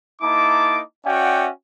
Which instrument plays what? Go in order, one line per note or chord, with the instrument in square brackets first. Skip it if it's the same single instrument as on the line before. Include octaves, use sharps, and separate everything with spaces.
[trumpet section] A#3 D#4 E4 A5 D6
C#4 F#4 D5 E5 F#5 G5